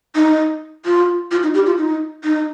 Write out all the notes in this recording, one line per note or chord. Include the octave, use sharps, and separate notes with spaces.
D#4
F4
F4
D#4
G4
F4
D#4
D#4